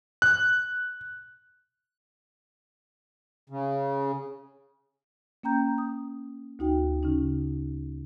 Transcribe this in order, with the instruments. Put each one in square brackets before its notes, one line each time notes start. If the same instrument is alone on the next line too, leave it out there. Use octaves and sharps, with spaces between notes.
[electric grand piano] F#6
[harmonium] C#3
[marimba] A#3 C#4 G5 A#5 G6
D#6
D2 D#4 F#4 G5
C#3 C#4 D#4